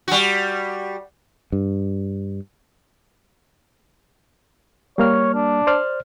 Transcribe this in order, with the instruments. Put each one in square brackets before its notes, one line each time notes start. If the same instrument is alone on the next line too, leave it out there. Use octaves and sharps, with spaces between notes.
[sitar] G3 F#4
[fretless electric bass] G2
[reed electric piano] G3 A#3 F6 [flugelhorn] C#5
[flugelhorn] D4
[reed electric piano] C5 D5 F6